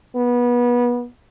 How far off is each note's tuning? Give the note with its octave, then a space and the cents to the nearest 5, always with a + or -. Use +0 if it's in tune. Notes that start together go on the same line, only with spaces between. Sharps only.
B3 -25